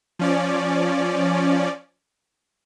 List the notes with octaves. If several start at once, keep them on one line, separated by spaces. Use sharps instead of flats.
F3 C#4 D5